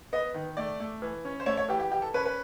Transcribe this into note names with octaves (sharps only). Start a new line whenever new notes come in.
B3 D#5
D#3
A3 D5
A3
E3
C#4
C5
A3 C#5
C#5
E3 G4
G4
E3 G4
A4
C#4 B4
B4